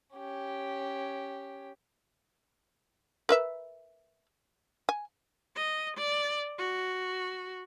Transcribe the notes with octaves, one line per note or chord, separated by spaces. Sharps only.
C#4 G4
A#4 B4 E5
G#5
D#5
D5
F#4